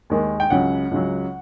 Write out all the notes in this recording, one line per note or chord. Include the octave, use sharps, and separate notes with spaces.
D#2 D#3 G#3
G5
C#2 C#3 F#3 F#5
C#2 C#3 F#3